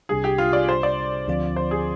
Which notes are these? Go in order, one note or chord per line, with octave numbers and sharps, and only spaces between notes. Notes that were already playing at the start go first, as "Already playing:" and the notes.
C2 C3 G3 D4 G#4
G4
F4
D5
C5
D5
D2 D3 F3 C4 F4
C5
G#4